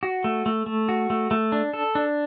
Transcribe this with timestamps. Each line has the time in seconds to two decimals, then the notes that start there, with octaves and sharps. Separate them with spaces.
0.03 F#4
0.24 A3
0.46 A3
0.66 A3
0.89 F#4
1.10 A3
1.31 A3
1.52 D4
1.73 A4
1.95 D4